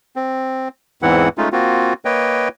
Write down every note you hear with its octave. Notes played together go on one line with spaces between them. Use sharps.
C4
E2 G#2 E3 C4 E4 F#5
G#3 A3 C#4 D#4 F4
A#3 C4 F4 F#4
A#3 B4 C#5 D#5 G5